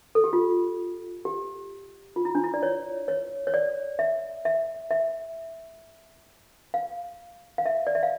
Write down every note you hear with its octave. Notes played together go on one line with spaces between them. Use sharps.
A4
G4
F4
G4
F4
E4
D4
E4
D5
C#5
C#5
C#5
D5
E5
E5
E5
F5
F5
E5
D5
E5
F5